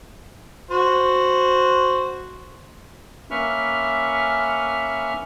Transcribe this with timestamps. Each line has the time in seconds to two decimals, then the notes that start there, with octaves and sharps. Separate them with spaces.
0.71 F#4 C5
3.31 A#3 C#4 B4 E5 C#6 F6